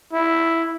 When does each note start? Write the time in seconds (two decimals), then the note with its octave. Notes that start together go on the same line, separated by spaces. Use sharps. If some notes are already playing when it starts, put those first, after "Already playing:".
0.13 E4